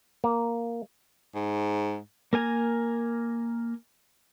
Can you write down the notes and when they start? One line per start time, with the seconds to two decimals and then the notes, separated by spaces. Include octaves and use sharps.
0.24 A#3
1.35 G#2
2.33 A#3 A#4 G#5 A#5